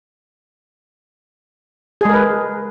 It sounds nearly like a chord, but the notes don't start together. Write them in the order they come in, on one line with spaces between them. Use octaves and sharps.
G#4 G#3 A#4 B4